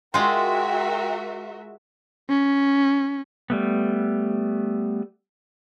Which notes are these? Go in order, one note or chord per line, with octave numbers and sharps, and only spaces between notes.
G#3 F4 F#4 A#4 E5 G5
C#4
G3 A3 B3